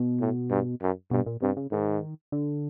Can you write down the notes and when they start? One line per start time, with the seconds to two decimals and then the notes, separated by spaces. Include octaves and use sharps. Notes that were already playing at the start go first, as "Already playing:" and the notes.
Already playing: B2
0.20 A2
0.50 G2
0.82 F#2
1.11 G2 B2
1.26 A#2
1.42 G2 C3
1.57 C#3
1.72 G#2 D#3
2.32 D3